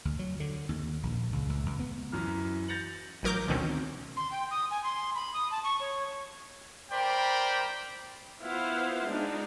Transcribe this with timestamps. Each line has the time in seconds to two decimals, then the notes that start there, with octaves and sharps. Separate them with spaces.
0.05 D2
0.19 F#3
0.40 D3
0.69 D#2
1.03 A#1
1.32 C#2
1.49 C#2
1.66 C#2
1.79 B3
2.12 F#2 E3 A#5 F6
2.68 G6 A6 A#6 C#7 F7 F#7
3.23 A1 F#3 A#4 D6 G6
3.48 D2 B2 D3 D#3 C4 C#4
4.17 C6
4.31 G5
4.51 D#6
4.70 G#5
4.84 C6
5.15 B5
5.33 D#6
5.51 A5
5.64 C#6
5.80 C#5
6.92 A#4 C5 D5 G5 B5
8.42 B3 E4 F4 C5 F5 F#5
9.06 G#3 D4 D#4